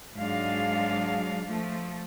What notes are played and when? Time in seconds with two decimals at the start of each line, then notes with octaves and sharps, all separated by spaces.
0.15 G#2 F#3 G#3 D4 F5
1.45 F3 A3